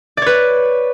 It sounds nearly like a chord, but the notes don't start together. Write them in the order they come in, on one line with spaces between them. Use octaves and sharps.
D5 C#5 B4